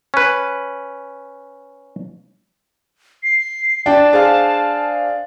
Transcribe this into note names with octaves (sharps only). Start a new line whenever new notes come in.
C#4 B4
C7
D4 G5 A5
G#4 C5 F5